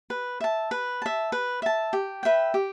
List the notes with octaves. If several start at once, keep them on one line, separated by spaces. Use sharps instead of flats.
B4
E5 A5
B4
E5 A5
B4
E5 A5
G4
B4 E5 G5
G4